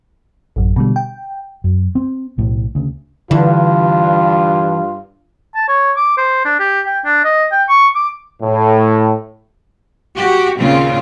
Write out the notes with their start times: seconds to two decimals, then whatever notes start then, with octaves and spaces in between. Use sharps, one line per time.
0.56 A1 F#2
0.76 B2 D3 G3
0.96 G5
1.64 F#2
1.95 C4
2.38 B1 A2
2.75 D2 C#3
3.31 G2 D3 E3 F4
5.56 A5
5.69 C#5
5.97 D6
6.17 C5
6.45 D4
6.60 G4
6.87 G5
7.05 D4
7.24 D#5
7.52 G5
7.69 C#6
7.95 D6
8.42 A2
10.15 F#4 G4
10.59 D#2 A#2 C#3 C4 F4